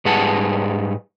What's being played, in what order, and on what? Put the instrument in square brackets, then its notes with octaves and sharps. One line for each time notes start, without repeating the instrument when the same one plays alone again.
[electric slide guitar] G#2 G3 G#4 B4 F#5 A5